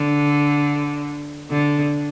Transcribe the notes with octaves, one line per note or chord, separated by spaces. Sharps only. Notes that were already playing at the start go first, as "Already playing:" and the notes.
Already playing: D3
D3